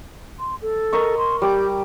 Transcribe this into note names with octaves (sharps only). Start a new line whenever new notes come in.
C6
A4
A#4 D#5 C#6
C6
G3 G4 D6